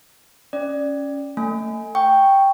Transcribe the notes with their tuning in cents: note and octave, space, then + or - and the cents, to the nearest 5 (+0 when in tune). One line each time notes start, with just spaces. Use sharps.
C#4 +0 D5 +0
A3 +25 G#5 +0
G5 +0 C#6 +0